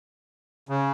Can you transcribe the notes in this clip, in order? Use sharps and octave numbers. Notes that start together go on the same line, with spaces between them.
C#3